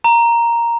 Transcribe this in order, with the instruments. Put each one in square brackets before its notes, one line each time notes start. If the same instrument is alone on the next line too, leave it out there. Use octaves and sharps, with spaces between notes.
[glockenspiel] A#5